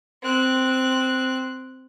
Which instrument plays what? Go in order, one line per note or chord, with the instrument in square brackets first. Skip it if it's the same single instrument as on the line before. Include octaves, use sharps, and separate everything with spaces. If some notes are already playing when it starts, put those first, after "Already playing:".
[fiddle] C4 F#6